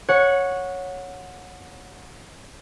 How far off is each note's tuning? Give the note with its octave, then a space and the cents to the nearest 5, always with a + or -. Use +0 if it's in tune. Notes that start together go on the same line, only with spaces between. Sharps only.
C#5 +0 F#5 -20